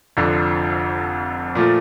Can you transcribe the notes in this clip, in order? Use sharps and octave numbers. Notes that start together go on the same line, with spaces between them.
F1 F2 D3 F3
A#2 F3 A3